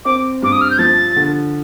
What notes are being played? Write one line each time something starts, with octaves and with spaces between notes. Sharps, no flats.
C4 D6
G2 D6
D#6
F6
G6
F3 A6
D3